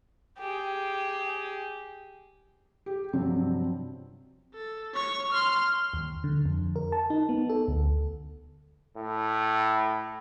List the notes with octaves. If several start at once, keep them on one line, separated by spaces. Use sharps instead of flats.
G4 G#4
G4
G2 C3 F3 F#3 C4
A4
C#5 C#6
C6 F6
D#2
D3
F2
A#4
A5
D#4
B3
A4
D2
A2